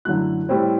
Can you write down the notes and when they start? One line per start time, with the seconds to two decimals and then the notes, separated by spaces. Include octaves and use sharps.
0.05 F#2 D3 F#3 A3 E4 F#6
0.48 A2 G3 C4 E4